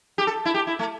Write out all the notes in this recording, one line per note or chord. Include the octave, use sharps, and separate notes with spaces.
G4
A4
E4
G4
E4
A3